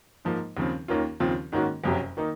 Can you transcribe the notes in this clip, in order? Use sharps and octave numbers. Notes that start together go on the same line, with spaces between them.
G#2 F3 A#3
D#2 C#3 F3 C4
D#2 D#3 A#3 C#4 F4
D#2 C#3 F3 C4 F4
G#2 D#3 A#3 C#4 F#4
F#1 F2 C3 F#3 C#4
D#3 A#3 D#4